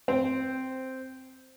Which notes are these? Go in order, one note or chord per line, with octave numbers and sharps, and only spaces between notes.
C4 C5